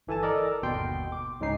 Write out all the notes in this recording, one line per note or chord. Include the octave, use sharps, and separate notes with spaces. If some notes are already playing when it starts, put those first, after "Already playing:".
G1 E3 A4 G#5 A5
A4 A#4 D5 D#5
G1 D#2 B2 G5 C6
D6
C#2 G#2 G#3 C#4 D#4 C7